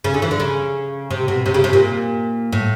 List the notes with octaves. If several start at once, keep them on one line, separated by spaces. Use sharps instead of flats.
C#3
D3
E3
D3
C#3
C3
B2
C3
C#3
C3
A#2
A2